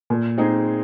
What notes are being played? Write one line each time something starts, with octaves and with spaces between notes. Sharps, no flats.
A#2
G#3 C4 D#4 G#4